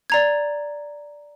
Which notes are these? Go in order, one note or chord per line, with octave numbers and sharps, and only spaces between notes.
D5 A#5 G#6